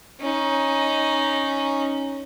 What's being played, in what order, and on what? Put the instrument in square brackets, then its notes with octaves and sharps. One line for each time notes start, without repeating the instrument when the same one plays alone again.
[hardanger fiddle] C#4 D#4